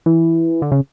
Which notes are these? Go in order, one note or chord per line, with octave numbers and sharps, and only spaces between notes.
E3
D3
C#3